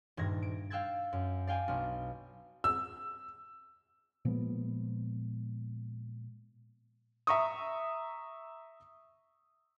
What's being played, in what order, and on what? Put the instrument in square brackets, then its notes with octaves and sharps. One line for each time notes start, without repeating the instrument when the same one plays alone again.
[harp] D#1 G2 G#6 A#6
D7
F5 G5 E6 F#6 G#6 A6
F#2
D5 F5 G5 G#5
B1 D4 F6
[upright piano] E6
[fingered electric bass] A#2 F3 G#3 B3
[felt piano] E5 A#5 C#6 D#6